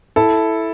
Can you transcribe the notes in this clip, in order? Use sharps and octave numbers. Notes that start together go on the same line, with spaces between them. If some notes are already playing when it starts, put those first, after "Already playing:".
E4 A4